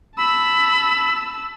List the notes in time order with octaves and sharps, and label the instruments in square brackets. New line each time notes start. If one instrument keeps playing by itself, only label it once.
[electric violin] A5 E6 [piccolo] B5